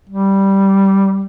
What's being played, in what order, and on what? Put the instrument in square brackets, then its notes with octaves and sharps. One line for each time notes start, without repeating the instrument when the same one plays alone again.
[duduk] G3